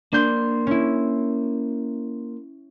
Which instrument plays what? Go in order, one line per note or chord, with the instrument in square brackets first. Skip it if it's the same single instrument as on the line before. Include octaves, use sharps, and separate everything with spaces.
[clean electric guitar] A#3 A#4 C5 [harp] D4 G6
[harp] C#4 E4